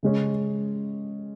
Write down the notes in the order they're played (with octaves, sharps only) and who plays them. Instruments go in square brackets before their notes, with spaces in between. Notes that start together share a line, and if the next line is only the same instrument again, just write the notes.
[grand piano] C#3 G#3 C#4